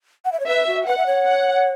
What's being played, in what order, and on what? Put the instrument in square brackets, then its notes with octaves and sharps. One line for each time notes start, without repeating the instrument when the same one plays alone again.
[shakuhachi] F#5
E5
C#5
[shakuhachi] B4 [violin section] E5
[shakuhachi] F#4
[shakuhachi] B4 [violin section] F#5
[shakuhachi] E5
C#5
[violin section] F#5